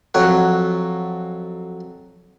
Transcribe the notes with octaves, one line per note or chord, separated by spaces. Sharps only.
F2 F#3 C#5 F#5